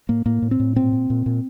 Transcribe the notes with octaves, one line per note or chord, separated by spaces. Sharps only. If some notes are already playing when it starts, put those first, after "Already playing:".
A2 A#3
A2 A#3
A2
C4
A2
A#2 C4
A#2
A#2
A#2